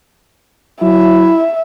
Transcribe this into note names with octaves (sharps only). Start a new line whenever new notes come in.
F#3 E4 E5